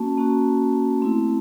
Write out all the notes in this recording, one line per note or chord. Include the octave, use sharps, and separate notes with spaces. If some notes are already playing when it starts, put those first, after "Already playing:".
Already playing: A#3 C#4 F#4 A5
A#3 C#4 F#4
A3 C4 E4